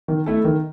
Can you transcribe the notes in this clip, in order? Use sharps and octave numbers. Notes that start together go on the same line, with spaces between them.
D#3
A3 E4 A4
D#3